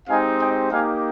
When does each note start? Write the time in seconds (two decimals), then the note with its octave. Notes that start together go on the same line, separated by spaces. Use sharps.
0.08 G#3 C4 D#4 G4 F5 G#5
0.40 D#5 G5
0.71 A#3 D#4 G4 F5 G#5